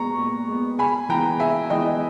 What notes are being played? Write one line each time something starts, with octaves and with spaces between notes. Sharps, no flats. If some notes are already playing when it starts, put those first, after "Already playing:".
Already playing: A#2 G#3 B3 A#5 C#6
A#2
G#3 B3
C#3 G#5 B5
E3 G#3 B3 G5 A#5
C#3 E5 G#5
E3 G#3 B3 D#5 G5